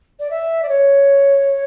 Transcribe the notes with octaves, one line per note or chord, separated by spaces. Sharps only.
D5
E5
D5
C#5